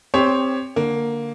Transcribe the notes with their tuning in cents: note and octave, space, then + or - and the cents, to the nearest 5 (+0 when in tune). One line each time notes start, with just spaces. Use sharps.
C4 +0 G4 +25 C#5 +10
D3 +0 A#3 +0